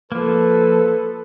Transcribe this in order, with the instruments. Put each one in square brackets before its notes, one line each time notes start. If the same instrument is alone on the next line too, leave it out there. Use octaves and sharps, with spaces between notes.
[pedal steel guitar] F3 A#3 [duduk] A4 [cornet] B4